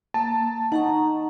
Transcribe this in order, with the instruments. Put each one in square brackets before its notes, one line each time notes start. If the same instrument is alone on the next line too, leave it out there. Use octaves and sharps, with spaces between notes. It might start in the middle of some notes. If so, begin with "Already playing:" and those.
[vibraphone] A#3 [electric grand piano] A5
[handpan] D#4 [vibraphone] F#5 A#5 C#6